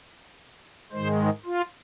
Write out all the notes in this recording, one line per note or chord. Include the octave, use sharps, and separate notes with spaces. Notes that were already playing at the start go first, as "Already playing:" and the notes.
G#2 D#3 G#3 C5
F4